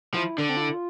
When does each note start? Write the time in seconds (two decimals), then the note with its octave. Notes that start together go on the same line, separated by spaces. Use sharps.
0.14 F3 E4
0.38 D3 D4
0.49 C4
0.57 F4
0.62 E4
0.74 F4